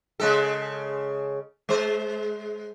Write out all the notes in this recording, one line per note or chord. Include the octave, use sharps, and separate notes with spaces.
C#3 G#3 A4
G#3 C5